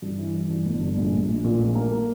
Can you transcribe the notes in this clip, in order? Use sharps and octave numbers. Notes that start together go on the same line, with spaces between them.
G2
E3
E3
G2
G1
G2
A#1
A#1
A#1
A#2
A#1
A#3
A#3